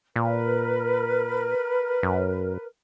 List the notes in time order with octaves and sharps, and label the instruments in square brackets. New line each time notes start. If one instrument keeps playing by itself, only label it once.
[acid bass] A#2 [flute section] A#4 B4
[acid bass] F#2